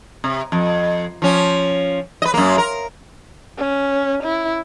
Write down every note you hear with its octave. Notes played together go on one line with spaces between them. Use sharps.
C3
F2
F3 C#4
B4 D#5
F#2 A#3
A#4
C#4
E4